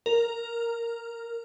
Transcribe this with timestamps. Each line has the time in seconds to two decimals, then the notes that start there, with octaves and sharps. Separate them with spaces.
0.06 A#4